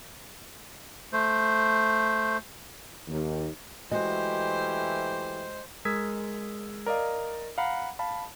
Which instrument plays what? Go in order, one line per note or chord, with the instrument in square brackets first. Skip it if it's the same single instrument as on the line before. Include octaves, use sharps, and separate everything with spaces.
[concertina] A3 C5
[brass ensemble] D#2
[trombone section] E3 A3 G4 [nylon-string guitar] G#3 F#4 D#5 [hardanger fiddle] C5
[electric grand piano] G#3 A#4 D#6 E6 G#6 B6
A#4 D5 D#5 F5
F5 F#5 A#5 B5
F5 A5 B5